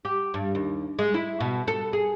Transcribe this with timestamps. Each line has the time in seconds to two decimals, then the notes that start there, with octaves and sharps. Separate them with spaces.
0.05 G4
0.34 G2
0.55 D#2
0.99 G#3
1.14 E4
1.40 B2
1.68 A4
1.93 G#4